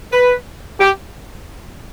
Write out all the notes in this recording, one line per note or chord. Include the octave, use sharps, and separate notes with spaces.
B4
G4